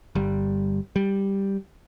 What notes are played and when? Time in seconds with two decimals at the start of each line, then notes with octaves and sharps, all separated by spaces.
0.15 G1 G3
0.96 G3